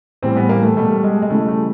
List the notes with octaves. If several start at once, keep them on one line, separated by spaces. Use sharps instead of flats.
A2 E3 G3 C4
B3
A#3
A3
B2 G3 A3
G#3
G#3
C#3 E3 G3 A3
A3